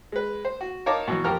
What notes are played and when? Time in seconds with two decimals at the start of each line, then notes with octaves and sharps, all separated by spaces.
0.12 G#3 B4
0.45 C5
0.61 F#4
0.86 D#4 A#4 C#5 F5 A5 D6
1.07 B2 E3 F#3
1.24 F2 G4 A#4 G5 F6